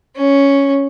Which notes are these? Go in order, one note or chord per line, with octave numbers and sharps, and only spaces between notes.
C#4